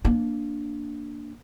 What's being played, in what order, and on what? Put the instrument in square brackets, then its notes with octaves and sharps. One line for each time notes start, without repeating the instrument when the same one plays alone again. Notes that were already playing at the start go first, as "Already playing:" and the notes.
[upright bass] A#3 D4